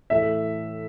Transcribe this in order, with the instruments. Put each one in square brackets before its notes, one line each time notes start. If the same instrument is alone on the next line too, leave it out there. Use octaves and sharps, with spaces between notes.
[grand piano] A2 E3 A3 E5